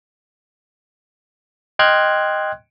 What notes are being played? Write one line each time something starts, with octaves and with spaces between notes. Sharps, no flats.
D#5 G5 C6 F6 F#6 G#6